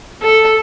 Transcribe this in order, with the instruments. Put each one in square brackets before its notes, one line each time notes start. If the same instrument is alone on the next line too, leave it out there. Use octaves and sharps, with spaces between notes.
[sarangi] A4